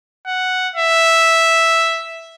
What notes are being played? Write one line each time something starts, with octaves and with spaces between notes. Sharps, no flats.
F#5
E5